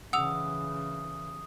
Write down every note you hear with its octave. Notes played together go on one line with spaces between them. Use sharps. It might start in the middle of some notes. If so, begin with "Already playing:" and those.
C#3 E3 F#5 D#6 E6 F7